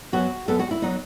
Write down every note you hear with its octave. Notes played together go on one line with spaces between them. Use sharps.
F#2 F#3 B3 F#4
F#2 F#3 B3 A4
F#4
E4
F#3 B3 D#4